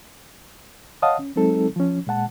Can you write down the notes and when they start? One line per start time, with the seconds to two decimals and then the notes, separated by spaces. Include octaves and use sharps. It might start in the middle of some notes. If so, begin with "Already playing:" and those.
1.02 C#5 D#5 F5 F#5 A5 D#6
1.19 C#4
1.36 F#3 G#3 C4 D#4 A4
1.76 F3 C#4
2.07 A#2 G#3 F#5 A5